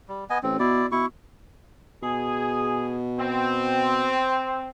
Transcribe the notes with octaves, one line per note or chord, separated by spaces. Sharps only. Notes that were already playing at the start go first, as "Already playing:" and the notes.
G3
B3 D#5 G#5
A1 C4
B2 E4 D5
B2 E4 C#6
B2 G#4
C4